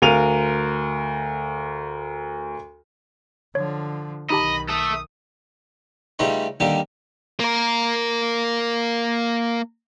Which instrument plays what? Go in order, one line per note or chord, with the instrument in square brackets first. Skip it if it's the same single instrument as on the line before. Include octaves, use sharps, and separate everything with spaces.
[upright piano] D2 A#4 F5 D#7 F7
[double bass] D3 F3 [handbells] C#5
[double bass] B1 D#3 [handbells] D#4 G4 A5 [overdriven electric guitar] D#5 [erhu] B5
[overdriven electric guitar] A4 E5 [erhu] D#6
[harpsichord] C#3 G3 A3 D#4 F4 B4
D#2 D3 G3 D#4 G4 F5
[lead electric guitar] A#3 A#4